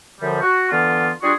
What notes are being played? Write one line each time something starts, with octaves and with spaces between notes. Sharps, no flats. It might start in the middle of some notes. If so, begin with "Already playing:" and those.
F#2 D3 F3 G3
F#4
D3 E3 B3 F4
G3 D4 F4 F#4 G#4